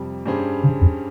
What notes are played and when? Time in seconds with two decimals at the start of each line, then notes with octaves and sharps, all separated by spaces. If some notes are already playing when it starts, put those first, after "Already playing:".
Already playing: F2 C3 G3
0.26 G2 G3 C#4 G#4 C5
0.63 C#3
0.81 F2